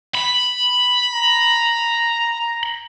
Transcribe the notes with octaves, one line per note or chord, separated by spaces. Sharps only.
B5
A#5